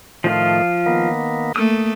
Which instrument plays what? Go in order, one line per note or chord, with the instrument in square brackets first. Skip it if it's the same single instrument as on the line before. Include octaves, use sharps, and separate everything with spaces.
[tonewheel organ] A2 D#3 A3 [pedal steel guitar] F3 F4
[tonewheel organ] D#3 A#3 B3
[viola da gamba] A3 A#3 [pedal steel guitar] D#6